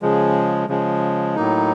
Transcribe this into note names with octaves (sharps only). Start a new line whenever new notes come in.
C#3 F3 G#3
C#3 F3 G#3
A2 F#3 A#3 D#4